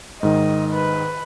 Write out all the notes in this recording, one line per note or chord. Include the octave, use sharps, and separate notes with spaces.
G#2 D#3 D#5
B4